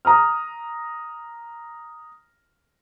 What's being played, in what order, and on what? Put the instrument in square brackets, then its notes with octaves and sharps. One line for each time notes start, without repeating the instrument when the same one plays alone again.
[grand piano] A#5 D#6 F6